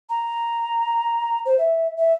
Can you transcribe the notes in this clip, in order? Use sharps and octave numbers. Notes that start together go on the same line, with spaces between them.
A#5
C5
E5
E5